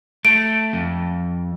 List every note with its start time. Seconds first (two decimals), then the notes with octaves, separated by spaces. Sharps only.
0.25 A3 D7
0.73 F2